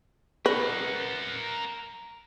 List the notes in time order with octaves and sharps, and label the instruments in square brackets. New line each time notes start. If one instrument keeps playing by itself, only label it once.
[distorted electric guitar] A#4 F#5 [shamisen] B4